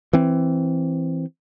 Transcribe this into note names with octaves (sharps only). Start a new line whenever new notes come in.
E3 C4